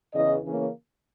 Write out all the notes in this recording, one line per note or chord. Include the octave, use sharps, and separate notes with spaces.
E2 C#3 E3 D#5
C#3 E3 A#3 C#4